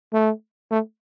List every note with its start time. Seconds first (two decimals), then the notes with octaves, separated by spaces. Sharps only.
0.13 A3
0.71 A3